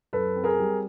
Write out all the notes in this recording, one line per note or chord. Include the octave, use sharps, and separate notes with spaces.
F#2 A4 B4
C4
G#4 A#4
G3